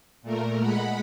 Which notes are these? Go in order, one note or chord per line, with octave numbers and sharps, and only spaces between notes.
A#2 A3 A#4
G#3 F#5 B5